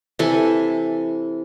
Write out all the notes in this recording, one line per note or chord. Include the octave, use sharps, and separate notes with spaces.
C3 E3 A4 G#5